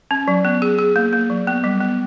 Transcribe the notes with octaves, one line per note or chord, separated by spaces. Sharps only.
C#4
F#3
B3
G#4
G#4
A#3
A#3
F#3
B3
G3
B3